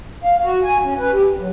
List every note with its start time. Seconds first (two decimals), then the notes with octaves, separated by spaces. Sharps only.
0.24 F5
0.43 F#4
0.64 G#5
0.82 C#4
0.98 B4
1.12 G4
1.28 E2
1.39 F#3